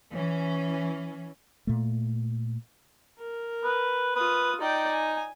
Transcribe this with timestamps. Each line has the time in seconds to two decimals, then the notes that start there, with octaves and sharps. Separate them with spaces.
0.12 E3 C#4
1.67 A#2 A3
3.19 A#4
3.64 B4
4.16 F4 B4 D#6
4.61 D#4 D5 G5
4.92 G#5